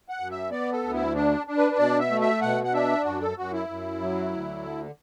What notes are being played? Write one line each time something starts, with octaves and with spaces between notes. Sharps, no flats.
F#5
F#2
E5
B3 D5
A4
D2
E4
D4
D4
B4
B4
B2 D5
E5
A3
E5
B2 F#5
F#5
D4 E5
F#2 F#4
A4
F#2 F#4
E4
F#2
F#3
D2
D3